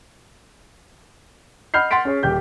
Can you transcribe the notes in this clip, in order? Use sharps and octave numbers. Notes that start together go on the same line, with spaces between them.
D#5 F#5 B5 F6 G6 C7
F#5 C6 A6 B6 D7
C#4 G#4 C#5
D#1 G4 G6